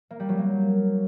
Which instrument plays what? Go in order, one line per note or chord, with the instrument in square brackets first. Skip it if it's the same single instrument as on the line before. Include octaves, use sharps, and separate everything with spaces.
[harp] A#3
G3
F#3
A#3